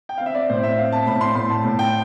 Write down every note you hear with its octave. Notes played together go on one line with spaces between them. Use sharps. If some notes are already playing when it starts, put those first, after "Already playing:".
G5
C4 F5
E5
D5
A2 C5
E5
C4 F5
A5
A2 B5
C6
A2 C6
A5
A2
G5